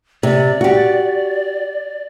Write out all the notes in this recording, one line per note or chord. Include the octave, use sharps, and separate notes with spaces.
C3 D5
F#4 G4